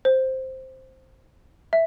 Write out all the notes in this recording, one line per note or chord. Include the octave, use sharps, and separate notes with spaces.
C5
E5